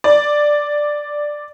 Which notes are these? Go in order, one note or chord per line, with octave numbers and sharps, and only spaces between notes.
D5